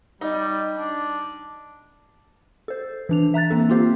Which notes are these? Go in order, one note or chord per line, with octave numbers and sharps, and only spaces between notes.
G3 D#4
D4
A4 C5
E3 D4 F7
E5 A#5 F#6 A6
A#3 C4 A4
A#3 C4 F4 G4 C5 F5